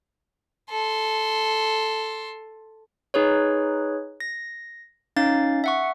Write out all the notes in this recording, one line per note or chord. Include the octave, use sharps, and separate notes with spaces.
A4 C6
D#4 G#4 B4 C#5
A#6
C#4 D#4 F5 A6
E5 F#5 C#6